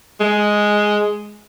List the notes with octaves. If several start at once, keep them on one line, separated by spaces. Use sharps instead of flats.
G#3